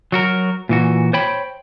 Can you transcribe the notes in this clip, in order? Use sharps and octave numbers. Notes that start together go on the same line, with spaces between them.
F#3 F#4 A#4
A#2 E3 F#4
C5 C#5 G5 B5